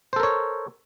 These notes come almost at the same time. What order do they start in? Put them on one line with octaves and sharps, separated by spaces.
C5 A4 A#4 C#5